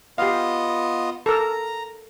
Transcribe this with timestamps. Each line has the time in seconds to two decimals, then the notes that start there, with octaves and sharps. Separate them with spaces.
0.18 B3 F4 G4 D#5 F5
1.26 A4 A#4 A#5